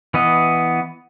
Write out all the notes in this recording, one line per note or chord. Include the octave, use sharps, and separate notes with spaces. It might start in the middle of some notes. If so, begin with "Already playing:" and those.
E3 B3 D#5